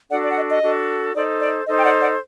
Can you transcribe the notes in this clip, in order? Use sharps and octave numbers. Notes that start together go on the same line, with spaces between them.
D4 F#4 A4 D5 F#5
D5
F#5
D#5
D#5
D4 F#4 A4
D#4 A4 C5 D5
D5
D#4 A4 C5 D#5
G5
D5 F#5
D5 F#5